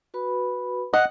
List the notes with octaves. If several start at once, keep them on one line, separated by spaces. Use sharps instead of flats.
F#4 B4 B5
D#5 F#5